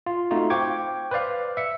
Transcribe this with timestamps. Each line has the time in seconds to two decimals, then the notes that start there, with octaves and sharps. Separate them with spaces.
0.06 F4
0.31 A3 C4 D#4 F4 F#4
0.50 C5 F5 G5 C#6 D6 G#6
1.11 B4 C5 D5 F5
1.57 E5 C#7